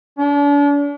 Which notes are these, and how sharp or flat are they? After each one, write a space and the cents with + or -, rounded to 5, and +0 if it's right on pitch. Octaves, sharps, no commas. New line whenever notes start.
D4 -40